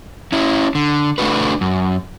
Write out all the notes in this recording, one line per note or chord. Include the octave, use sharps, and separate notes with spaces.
C#4 E4
D3
A3 D4 F#4 B4
F#2